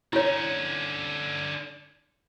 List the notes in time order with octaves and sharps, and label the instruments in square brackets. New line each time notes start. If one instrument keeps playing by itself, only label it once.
[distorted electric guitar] D3 C#4 [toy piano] E4 C#5